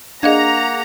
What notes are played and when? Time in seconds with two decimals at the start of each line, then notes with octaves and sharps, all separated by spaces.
0.23 A#3 D4 G#4 D#5 F5 F#5 A#5 G#6